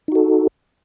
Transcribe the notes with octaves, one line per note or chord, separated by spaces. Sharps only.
D#4 F#4 A4